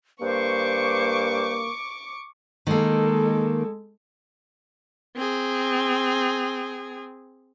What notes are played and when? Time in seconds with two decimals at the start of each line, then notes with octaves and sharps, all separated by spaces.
0.21 G2 A#3 C5 C#6 D6
2.67 D#3 G#3 A#3 A4
5.16 C4 G#4